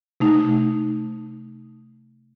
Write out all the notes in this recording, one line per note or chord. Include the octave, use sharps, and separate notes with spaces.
C3 A3 D#4